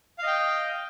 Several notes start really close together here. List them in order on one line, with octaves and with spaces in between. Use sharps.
F5 D#5 G5